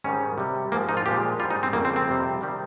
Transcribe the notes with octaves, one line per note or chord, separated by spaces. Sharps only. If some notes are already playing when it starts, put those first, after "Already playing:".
G#2 D#3 G3 C#4
C3 G3
G#2 F3 G#3 A#3
D#4
F4
A#2 F3 G#3 G4
G#2 G3 F4
D#4
C4
F2 C#3 G3 A#3
C4
C4
F2 C3 G3
C3 D#3 G3